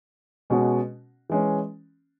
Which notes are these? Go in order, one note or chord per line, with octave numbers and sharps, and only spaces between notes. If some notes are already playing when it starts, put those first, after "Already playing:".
B2 G#3 C#4 F#4
E3 G#3 C#4